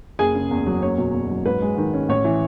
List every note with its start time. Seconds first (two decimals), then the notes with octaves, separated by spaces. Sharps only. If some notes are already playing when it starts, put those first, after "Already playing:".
0.19 F#1 G#4 G#5
0.35 C#3
0.51 E2
0.67 F#3
0.82 F#1 C#5
0.98 B2
1.14 E2
1.30 F#3
1.46 G#2 B4
1.62 G#3
1.78 D#3
1.93 C#4
2.09 A1 C#5
2.25 E3